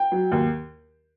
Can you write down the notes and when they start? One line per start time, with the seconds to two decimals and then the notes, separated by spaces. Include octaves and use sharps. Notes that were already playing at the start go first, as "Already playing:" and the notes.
Already playing: G5
0.12 F#3
0.32 D#2